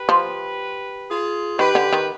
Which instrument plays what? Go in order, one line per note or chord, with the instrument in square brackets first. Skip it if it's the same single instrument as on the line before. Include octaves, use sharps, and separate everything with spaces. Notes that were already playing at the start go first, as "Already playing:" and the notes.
Already playing: [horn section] G4 B4
[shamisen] F3
[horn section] F4 G#4
[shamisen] D#3 [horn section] G4 B4
[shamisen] D3
D#3